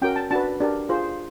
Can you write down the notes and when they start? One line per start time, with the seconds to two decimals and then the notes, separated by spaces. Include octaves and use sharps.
0.02 C#4 F#4 A#4 G5
0.16 A5
0.31 D4 F#4 B4 A5
0.60 D4 G4 A#4
0.89 F4 G#4 C5